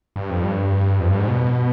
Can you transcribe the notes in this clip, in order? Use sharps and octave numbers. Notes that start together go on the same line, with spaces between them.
G2
F2
G2
F2
G2
G#2
B2